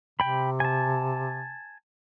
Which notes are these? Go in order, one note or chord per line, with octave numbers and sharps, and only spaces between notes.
C3 G5 B5
G#5 A5